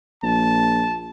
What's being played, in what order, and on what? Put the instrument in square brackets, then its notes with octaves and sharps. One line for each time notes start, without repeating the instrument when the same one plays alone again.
[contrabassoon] A#1 [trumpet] A5